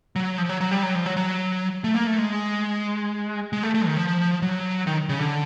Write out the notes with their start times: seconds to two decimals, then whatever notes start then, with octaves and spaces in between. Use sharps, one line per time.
0.16 F#3
0.38 F3
0.49 F#3
0.61 F#3
0.71 G3
0.83 F#3
0.95 F3
1.06 F#3
1.17 F#3
1.84 A3
1.95 A#3
2.06 A3
2.18 G#3
3.53 G#3
3.63 A3
3.74 A3
3.86 D#3
3.97 F3
4.42 F#3
4.87 D#3
5.09 C#3
5.20 D3